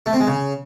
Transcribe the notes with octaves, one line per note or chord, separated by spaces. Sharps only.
A3
C4
G#3
C#3